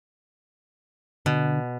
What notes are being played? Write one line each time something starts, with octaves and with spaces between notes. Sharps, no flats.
B2 D3